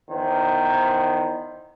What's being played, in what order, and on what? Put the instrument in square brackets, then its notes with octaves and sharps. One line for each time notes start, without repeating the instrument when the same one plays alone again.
[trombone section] E2 D#3 B3 C5